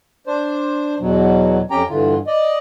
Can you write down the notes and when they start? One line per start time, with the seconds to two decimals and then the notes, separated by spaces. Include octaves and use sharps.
0.27 D4 C5
1.00 E2 B2 F#3
1.71 F2 C#4 G4 G5 A#5
1.89 G2 D3 E3 F4
2.27 D5 D#5